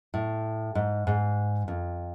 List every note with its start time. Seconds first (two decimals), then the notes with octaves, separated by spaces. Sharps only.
0.14 A2
0.75 G#2
1.07 G#2
1.68 F2